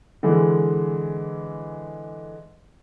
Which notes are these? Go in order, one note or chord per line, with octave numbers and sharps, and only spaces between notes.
D3 E3 G#3